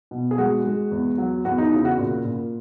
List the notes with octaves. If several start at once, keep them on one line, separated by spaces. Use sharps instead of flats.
B2
G#4
G#3 F#4
G#3
E2
F#3
E2 F#4
D#4
C#3 E4
F#4
A#2
A#2